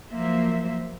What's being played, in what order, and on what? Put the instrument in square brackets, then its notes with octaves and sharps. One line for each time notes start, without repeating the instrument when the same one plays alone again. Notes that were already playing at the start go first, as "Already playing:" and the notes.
[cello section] F3 F#3 A#3 C5 E5